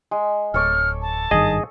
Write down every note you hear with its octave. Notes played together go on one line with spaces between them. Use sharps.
G#3
D1 A4 C#5 D6 F6
A5
G#1 G2 D#3 G#4 D#5